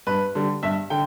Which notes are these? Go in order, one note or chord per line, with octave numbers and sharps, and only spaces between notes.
G2 B4
D3 G3
G2 E5
D3 G5